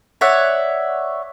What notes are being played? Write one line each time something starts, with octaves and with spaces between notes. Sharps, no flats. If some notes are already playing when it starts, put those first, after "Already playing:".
C#5 D5 E5 F#5